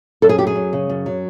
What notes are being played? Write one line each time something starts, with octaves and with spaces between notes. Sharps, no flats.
F#2 A4
G#4
F#3 G4
G#4
F#2
C#3
F#2
F#3